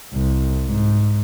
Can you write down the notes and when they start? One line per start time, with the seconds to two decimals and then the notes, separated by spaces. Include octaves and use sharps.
0.14 C2
0.65 G#2